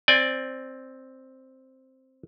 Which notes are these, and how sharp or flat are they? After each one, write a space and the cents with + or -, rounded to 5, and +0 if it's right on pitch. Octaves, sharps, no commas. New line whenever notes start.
C4 +0 D5 +0 G#5 -40